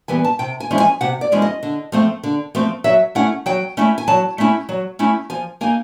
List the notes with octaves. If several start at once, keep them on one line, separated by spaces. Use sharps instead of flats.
E3 G3 B3 G#5
A5
C3 G5
G#5
F3 G#3 C#4 E4
G#5
C3 F#5
D5
F3 G#3 C#4 E4
D#5
D3
F3 A3 C4
D3
F3 A3 C4
F#3 E5
A3 C#4 E4 F#5
F#3 G5
A3 C#4 E4
G#5
F#3 A5
A3 C#4 E4
F#3
A3 C#4 E4
F3 G#5
A#3 D#4 G#5